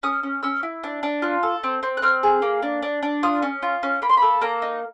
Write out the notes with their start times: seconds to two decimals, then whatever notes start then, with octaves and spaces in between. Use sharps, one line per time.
0.03 C#4 D#6
0.23 C#4
0.43 C#4 E6
0.63 E4
0.84 D4
1.03 D4
1.22 F4 F#6
1.43 A4
1.63 C4
1.83 C4
1.97 F#6
2.02 C4 F6
2.23 G#4
2.42 A#3
2.62 D4
2.83 D4
3.03 D4
3.23 F4 D#6
3.42 C#4
3.62 F4
3.83 C#4
4.02 A#3 B5
4.09 C6
4.17 A4 B5
4.41 A#3 A#5
4.62 D#4